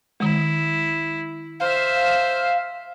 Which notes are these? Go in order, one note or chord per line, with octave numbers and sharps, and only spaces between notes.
D#3 G#3 E4
C5 E5 F5